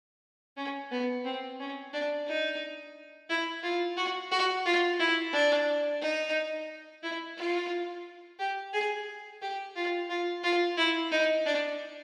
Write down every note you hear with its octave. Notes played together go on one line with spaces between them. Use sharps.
C#4
B3
C4
C#4
D4
D#4
E4
F4
F#4
F#4
F4
E4
D4
D#4
E4
F4
G4
G#4
G4
F4
F4
F4
E4
D#4
D4